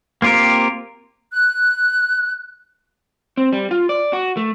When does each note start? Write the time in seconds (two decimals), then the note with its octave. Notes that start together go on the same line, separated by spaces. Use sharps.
0.22 A#3 C4 F4 G4 A#4
1.32 F#6
3.37 C4
3.52 G3
3.71 F4
3.89 D5
4.13 F#4
4.37 A3